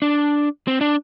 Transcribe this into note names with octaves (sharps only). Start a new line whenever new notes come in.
D4
C4
D4